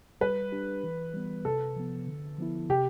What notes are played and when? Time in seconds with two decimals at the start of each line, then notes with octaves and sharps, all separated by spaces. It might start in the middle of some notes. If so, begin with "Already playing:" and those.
0.21 G3 B4
0.52 D4 G4
0.84 E3
1.14 G3 B3
1.45 C3 A4
1.76 F3 B3
2.07 D3
2.39 F3 B3 E4
2.69 C3 G4